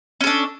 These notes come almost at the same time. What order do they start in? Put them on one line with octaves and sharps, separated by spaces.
C#4 A4 D4